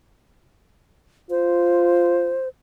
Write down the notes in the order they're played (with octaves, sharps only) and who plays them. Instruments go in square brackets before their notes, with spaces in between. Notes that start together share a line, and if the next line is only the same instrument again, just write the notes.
[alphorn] F4 [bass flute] C5